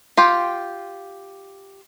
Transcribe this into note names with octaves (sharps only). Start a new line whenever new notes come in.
F4 G4 G5